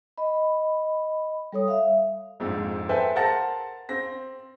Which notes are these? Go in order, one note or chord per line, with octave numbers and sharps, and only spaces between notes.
D#5 B5
G3 A4 C#5 D#6
E5 F5
A#1 F2 G#2
A4 B4 C5 E5 G5 G#5
A#4 C5 F#5 A5 A6 A#6
C4 A#6